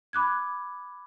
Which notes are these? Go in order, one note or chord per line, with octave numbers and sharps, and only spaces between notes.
B5 D6 F#6 G#6